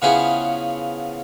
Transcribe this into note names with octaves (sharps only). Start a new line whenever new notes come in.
C#3 F3 B3 C#4 E4 G#4